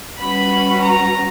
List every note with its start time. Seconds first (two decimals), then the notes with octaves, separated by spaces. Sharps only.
0.19 G3 C#4 F#4 B4 B5
0.84 A#5